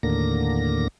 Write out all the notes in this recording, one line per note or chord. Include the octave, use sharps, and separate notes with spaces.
D#2 A2 D3 A#3 A#6